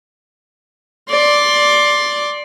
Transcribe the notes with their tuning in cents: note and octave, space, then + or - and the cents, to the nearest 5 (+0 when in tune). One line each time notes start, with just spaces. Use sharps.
D5 +0 C6 +15